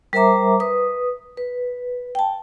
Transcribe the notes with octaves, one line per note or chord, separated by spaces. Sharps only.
G3 A#4 C5 E5 A#5 D6
B4 D#6
B4
G5 A5